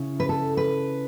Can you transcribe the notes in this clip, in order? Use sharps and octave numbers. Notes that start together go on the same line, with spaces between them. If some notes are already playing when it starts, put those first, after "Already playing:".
Already playing: C#3 C#4 E4
B4
A4
B4